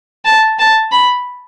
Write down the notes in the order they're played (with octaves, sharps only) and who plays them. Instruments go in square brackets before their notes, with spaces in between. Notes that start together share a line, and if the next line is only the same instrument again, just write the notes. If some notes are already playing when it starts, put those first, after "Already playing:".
[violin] A5
A5
B5